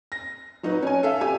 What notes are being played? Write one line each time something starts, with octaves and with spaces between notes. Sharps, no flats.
A#6
F#3 D#4 F#4 B4
C#4 G#5
A4 E5 F5
G4 G#5